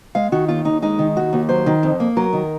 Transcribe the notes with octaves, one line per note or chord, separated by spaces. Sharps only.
G#3 F5
D#3 F#4
D#2 F4
D#2 D#4
G#3 D#4
D#3
D#2 F#4
D#2
F#3 C5
D#3
F2
A#3
F#3 A#4
D#3